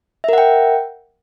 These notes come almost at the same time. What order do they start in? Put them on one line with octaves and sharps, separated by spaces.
E5 A#4 F#5 G5